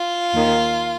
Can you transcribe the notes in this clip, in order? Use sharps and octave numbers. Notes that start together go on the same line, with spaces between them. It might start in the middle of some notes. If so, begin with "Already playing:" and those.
Already playing: F4
D#2 D#3